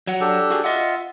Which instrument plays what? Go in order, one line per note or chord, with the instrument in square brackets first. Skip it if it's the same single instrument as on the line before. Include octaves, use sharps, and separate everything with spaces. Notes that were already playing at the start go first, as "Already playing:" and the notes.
[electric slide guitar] F#3 F#5
[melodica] D4 G4 A4
[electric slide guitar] F#4 G#4
[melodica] F4 E5 [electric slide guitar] D#5 F#5